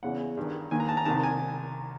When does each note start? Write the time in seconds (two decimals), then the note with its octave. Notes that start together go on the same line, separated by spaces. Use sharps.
0.03 E2 C#3 E3 F#5
0.37 G2 D#3
0.71 D#2 D#3 G#5
0.80 A#5
0.89 A5
0.97 A#5
1.05 C2 C3 D#3 A5
1.23 G#5